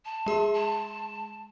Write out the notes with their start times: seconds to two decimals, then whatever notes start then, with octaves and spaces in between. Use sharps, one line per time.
0.05 A5
0.26 G#3 G#4 C6
0.54 A5